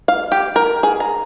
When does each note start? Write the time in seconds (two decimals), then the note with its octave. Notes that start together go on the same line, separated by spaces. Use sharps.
0.08 F5
0.32 G4
0.56 A#4
0.83 G#4
1.00 A#5